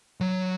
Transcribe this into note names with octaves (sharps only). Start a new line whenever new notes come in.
F#3